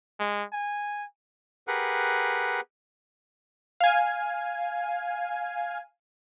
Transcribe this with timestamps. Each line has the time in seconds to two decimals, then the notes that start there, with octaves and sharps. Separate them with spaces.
0.19 G#3
0.52 G#5
1.67 G4 G#4 A#4 B4 F#5
3.80 F5 G#5